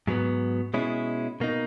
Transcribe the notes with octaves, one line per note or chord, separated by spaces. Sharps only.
G#2 F#3 B3
B2 G#3 C#4 E4
B2 A#3 D#4